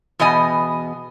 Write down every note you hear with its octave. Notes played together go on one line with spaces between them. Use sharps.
E2 B2 B3 D#5 G#5